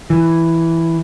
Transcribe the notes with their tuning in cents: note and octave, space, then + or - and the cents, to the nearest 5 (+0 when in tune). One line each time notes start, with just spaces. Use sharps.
E3 +0